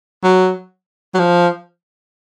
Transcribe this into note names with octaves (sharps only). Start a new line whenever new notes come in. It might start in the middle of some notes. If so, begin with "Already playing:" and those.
F#3
F#3
F3